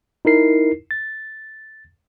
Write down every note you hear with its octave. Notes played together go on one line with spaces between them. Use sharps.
D#4 E4 A#4 C7
A6